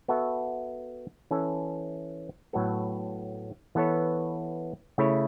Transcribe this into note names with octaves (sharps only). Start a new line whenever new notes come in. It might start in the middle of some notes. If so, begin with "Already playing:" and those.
B3 F#4 A4 E5
E3 C#4 A4
A2 F#3 B3 A4
E3 B3 A4 C#5
C#3 A3 E4 C#5